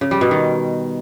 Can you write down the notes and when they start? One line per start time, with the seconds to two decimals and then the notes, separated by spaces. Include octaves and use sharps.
0.01 C#3
0.11 G3
0.21 B2
0.31 D#3